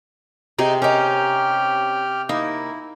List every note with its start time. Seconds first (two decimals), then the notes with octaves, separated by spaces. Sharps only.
0.59 C3 D#4 G4 G#4
0.82 C#4 D#4 G4 A#4 G5 F6
2.29 A#3 D#4 E4